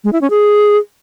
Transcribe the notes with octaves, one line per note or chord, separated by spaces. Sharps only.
G#3
E4
C#4
G#4